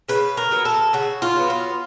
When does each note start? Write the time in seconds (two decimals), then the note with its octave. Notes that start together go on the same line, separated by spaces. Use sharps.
0.08 C#3 B4
0.37 A#4
0.51 F#3 B3
0.65 A4
0.93 C#3 F#4
1.22 F4
1.36 F#3 B3
1.50 F4